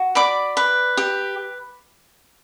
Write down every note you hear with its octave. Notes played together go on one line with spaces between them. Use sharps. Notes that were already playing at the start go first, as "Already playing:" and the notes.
Already playing: F#4
D5 B5 D6
B4
G4